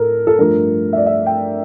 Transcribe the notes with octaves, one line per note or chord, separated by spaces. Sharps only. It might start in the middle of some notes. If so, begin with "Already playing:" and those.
Already playing: A2 A4 A#4
A4
G2 F3 A3 A#4
E5
D5
E5
G5